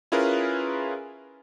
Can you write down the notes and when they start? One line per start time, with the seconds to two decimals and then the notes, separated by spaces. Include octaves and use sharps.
0.12 C#4 E4 F4 G#4 A#4 B4